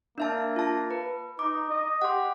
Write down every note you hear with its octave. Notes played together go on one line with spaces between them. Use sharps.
A#3 D4 E5 A5
F4 A5
B4
D#4 D6
D#5
G4 F#5 C6